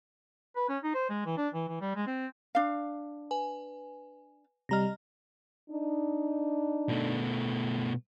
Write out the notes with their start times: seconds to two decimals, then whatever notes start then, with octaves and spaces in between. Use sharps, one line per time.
0.56 B4
0.69 C#4
0.83 D#4
0.95 C5
1.09 G#3
1.26 E3
1.37 D4
1.54 E3
1.68 E3
1.81 G3
1.95 G#3
2.07 C4
2.55 D4 F5
3.31 B4 G#5
4.69 C3 G3 D#5 A#5 F6 A#6
5.71 D4 D#4
6.89 B2 A3